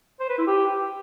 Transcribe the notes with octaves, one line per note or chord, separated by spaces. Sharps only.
C5
B4
E4
G4